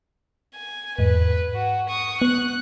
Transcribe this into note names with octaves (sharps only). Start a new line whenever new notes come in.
G#5
E2 G#2 B4
F#4
C#6 D#6
B3 F#6 C#7